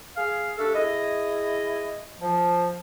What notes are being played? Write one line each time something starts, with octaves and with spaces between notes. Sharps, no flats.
G#4 F5
A3 D4 G4 A4
E4 G#4 D#5
F3